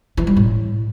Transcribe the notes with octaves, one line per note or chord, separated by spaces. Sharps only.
E3
G3
A2